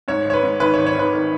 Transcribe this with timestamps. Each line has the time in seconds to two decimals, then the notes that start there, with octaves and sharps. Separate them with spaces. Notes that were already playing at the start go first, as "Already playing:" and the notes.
0.08 G#2 C#5
0.25 G#1
0.30 C#5
0.33 B4
0.43 G#2
0.60 D#3 B4
0.74 C#5
0.78 G#1
0.86 C#5
0.95 D#3 B4
1.13 D#3